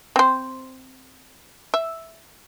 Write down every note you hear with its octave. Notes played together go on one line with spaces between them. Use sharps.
C4 C5
E5